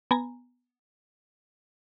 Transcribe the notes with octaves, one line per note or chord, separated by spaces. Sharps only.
B3 G#5 A#5